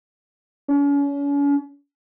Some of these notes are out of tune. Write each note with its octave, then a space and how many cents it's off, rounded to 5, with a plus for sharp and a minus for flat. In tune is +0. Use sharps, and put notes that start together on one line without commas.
C#4 +40